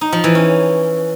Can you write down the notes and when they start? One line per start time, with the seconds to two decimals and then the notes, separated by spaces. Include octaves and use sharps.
0.01 D#4
0.13 F3
0.24 E3
0.35 C#4